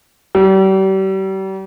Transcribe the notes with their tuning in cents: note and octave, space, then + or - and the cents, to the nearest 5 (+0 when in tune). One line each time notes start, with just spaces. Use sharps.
G3 -40